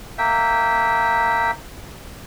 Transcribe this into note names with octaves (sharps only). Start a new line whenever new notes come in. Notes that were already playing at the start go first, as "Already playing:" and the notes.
A#3 E5 G5